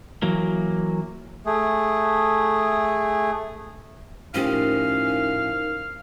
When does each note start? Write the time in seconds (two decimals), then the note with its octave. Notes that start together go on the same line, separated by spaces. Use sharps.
0.22 E3 F#3 A#3
1.46 A3 G#4
4.34 A2 F3 C#4 D#4 G4 A#4 C5 F5